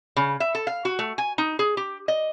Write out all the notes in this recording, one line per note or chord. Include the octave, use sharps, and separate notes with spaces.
C#3
E5
A4
F5
F#4
A3
G#5
D#4
G#4
G4
D#5